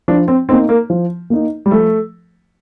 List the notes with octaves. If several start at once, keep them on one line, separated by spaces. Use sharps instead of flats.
F3 D4
C4
A#3 C4 D#4
A#3
F3
A#3 D#4
G3
F3 A3